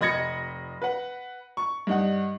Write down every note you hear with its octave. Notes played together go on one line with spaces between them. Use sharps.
F1 D#5 B5 G#6 A#6 C#7
B4 F#5
C#6
G2 D#4 F#5